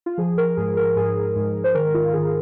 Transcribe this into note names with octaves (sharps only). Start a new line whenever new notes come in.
F4
F3 G#4
A#4
G#2 G#4
A#4
G#2 G#4
G#2
C5
D#3 A#4
F4
D#3 G#4